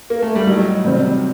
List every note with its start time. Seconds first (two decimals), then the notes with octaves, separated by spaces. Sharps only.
0.10 A#3
0.22 A3
0.35 G3
0.46 A2 F#3 A3 D#4
0.84 C3 D#3 G3 C4